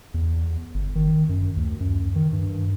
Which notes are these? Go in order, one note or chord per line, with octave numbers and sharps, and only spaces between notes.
E2
G1
D#3
F#2
D2
F#2
D#3
G2